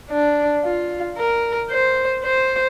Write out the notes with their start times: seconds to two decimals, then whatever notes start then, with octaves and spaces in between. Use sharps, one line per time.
0.11 D4
0.64 F4
1.18 A#4
1.71 C5
2.24 C5